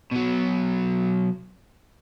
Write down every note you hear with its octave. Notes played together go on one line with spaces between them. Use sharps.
B2 F#3